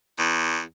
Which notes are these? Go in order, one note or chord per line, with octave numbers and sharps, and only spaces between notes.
E2